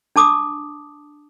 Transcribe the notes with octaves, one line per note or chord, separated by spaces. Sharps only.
D4 A5 D6 D#6